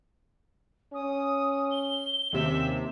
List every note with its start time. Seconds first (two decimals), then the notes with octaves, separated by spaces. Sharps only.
0.94 C#4 D#6
1.70 G7
2.33 D#2 C3 C#4 E5